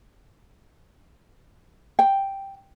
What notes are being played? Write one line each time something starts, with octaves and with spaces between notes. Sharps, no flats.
G5